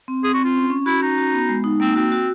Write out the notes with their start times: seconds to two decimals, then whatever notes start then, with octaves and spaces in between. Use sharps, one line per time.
0.08 C4
0.23 C4 G#4
0.34 F#4
0.39 C4
0.44 F4
0.55 C#4
0.70 C#4
0.86 E4 F#4
1.02 C#4 D#4
1.18 F#4
1.33 B3
1.49 G#3
1.64 D#4
1.80 A#3 C4
1.95 C4 F#4
2.12 F#4